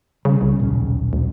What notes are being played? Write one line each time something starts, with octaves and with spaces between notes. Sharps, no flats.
C#3 G3 C#4
C2
D#1 B1 C#4
D2